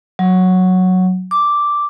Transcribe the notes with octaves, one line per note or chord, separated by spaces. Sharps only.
F#3
D6